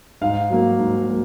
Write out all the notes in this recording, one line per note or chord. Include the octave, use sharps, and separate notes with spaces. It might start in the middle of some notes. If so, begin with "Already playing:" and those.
G#2 F5
F#3 A#3
G#2
F#3 A#3